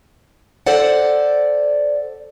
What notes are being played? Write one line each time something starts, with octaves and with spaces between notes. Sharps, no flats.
A4 C5 D5 F#5